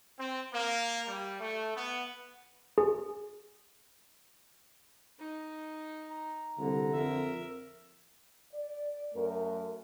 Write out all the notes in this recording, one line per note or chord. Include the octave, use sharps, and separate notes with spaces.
C4
A#3
G3
A3
B3
G#4
D#4
A#5
C2 D3
F2 A#4 E5
D5
F#2 A3 A#4